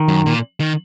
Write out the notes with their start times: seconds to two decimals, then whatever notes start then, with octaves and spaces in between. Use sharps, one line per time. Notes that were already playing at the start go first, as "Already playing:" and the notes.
Already playing: D#3
0.08 F#2
0.26 A#2
0.60 D#3